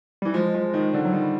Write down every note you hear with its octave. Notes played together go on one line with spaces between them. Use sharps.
E3 G3
F3 G#3
F3
D#3
D3
F#3
D#3 G3